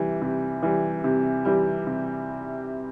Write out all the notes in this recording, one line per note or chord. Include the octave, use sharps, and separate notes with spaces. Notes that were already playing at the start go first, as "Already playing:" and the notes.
Already playing: C3 E3 G3
C3
E3 G3
C3
E3 G3
C3